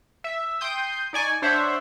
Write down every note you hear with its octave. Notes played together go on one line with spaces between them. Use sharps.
E5
G5 C6 D#6 G6
D#4 D5 G#5 C#6
D4 C5 C#5 E5 F#5